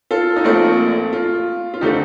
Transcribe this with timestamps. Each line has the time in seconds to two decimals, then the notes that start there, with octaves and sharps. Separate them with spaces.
0.11 F4 A4
0.36 D#4
0.44 A#1 A#2 A3 C4 F4
1.13 F4
1.74 F4
1.81 D3 A3 C4 D#4 G4